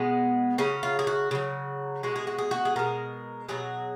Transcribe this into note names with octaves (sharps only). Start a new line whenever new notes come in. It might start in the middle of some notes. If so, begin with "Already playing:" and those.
Already playing: B2 G#3 B3
C#3 F#3 C#4
F4
G#4
F#4
C#3 F#3
B2 G#3 F#4
G#4
F#4
G#4
F#4
G#4
B2 G#3 A#4
B2 F#3 G#4